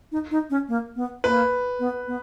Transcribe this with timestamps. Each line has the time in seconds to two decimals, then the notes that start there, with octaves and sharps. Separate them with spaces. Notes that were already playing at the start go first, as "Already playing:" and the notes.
0.12 D#4
0.31 D#4
0.50 C#4
0.68 A#3
0.96 B3
1.24 A#3 B4
1.79 B3
2.07 B3